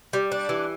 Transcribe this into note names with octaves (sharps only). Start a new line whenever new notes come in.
G3
D4
E3